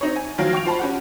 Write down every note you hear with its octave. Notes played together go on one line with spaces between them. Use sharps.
C4 D#4 C#5
G#5
D#3 F3 F#3 F5 D7
G5 C#6 D7 F7
F4 C5 A5 B5
C#4 G4 F#5